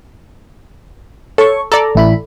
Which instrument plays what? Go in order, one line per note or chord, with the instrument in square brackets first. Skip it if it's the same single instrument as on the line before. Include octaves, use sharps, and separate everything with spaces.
[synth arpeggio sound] A4 [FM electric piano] C#5 C#6
[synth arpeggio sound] A4 D5 [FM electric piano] A#5
[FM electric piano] A1 E4 B5